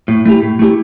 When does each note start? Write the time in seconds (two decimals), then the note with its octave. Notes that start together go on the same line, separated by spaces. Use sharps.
0.08 A2
0.25 A3 E4 G4
0.42 A2
0.59 A3 E4 G4